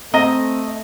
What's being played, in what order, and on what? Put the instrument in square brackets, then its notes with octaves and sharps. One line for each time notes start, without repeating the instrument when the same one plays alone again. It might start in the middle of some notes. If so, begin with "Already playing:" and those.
[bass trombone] A3 [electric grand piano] C4 A#6 [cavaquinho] D#5 A#5